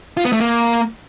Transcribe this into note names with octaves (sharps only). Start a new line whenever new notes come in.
F4
B3
A3
A#3